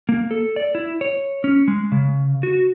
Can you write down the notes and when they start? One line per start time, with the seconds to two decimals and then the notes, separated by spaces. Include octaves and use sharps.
0.09 A#3
0.31 A4
0.56 D5
0.75 E4
1.01 C#5
1.44 C#4
1.68 G#3
1.92 C#3
2.43 F#4